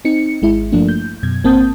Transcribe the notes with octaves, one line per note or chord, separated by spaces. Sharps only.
C4 D#4 C#7
G#1 G#3 E4
G2 F3 A3 A#3 D4
G6
F#2 B2 G#6
G#1 A#3 C4 A5 D#6 G6